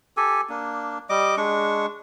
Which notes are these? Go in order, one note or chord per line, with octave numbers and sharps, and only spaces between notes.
G4 A4 G#5
A#3 D4
G3 D#5 D6
G#3 D4 C#6